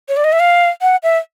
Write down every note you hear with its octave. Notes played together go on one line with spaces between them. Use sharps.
C#5
D5
D#5
E5
F5
F#5
E5